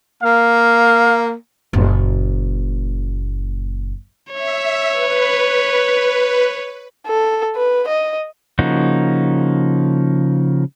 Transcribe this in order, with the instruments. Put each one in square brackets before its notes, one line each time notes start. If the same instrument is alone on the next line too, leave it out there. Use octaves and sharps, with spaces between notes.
[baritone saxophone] A#3 [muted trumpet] F5
[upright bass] F#1 A#2
[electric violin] C#5 [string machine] E5
[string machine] B4
[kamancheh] A4
B4
D#5
[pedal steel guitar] C#3 F3 A#3 D#4 F#4